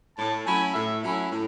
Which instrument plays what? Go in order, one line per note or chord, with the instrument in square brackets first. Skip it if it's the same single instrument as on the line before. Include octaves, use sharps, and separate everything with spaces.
[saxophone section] A2 [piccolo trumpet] A5
[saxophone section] F#3 A3 C#4 E4 [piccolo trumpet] G#5
[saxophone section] A2 [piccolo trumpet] E5
[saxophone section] F#3 A3 C#4 E4 [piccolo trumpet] E5
[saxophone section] A2